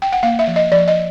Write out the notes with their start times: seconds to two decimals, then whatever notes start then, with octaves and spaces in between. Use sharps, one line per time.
0.02 G5
0.13 F#5
0.23 A#3 F5
0.39 E5
0.47 F3
0.56 D#5
0.72 F3 D5
0.88 D#5